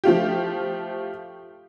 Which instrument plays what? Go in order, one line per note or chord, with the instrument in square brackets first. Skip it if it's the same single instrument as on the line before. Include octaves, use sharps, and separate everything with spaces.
[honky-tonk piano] F3 A3 F4 G4